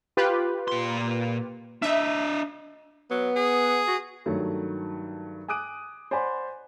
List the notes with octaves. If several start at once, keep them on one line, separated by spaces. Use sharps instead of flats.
F4 G4 B4
A#2 C6
D4 D#5 E5
F#3 B3
G#4
F#4
G2 D#3 F#3 A3
G#5 D6 D#6 F#6 D7 D#7
C5 D5 F#5 G#5 B5 C6